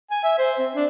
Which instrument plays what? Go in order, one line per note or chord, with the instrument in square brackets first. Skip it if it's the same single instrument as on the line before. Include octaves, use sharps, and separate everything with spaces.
[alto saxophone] G#5
E5
C5
C4
D4